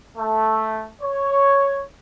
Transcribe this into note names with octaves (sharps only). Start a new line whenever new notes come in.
A3
C#5